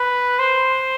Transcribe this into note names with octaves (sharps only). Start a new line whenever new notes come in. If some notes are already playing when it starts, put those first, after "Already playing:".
Already playing: B4
C5